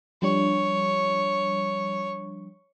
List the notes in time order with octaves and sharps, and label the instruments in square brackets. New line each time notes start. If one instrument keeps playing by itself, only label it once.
[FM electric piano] F3 G3 D4 [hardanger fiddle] C#5